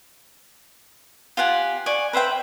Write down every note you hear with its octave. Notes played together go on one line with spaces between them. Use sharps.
F4 G4 F#5 G#5
D5 G#5 C#6
B4 C5 E5 G5